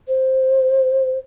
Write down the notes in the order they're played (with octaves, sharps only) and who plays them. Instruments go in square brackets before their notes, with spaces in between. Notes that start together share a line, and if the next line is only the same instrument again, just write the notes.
[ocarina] C5